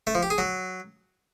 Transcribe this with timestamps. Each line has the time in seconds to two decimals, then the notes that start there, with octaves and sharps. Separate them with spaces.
0.07 A3
0.15 F3
0.23 G4
0.30 G#4
0.38 F#3